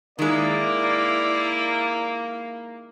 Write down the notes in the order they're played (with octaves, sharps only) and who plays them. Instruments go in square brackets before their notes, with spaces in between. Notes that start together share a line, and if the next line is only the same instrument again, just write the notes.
[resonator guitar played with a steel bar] D#3 G#3 [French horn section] A#3 [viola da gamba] E4 [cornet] D5